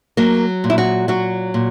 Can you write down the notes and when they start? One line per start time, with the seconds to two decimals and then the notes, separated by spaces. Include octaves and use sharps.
0.17 F#3 A#3
0.64 A#2
0.70 E4
0.78 F#4
1.08 F#3 F#4
1.54 A#2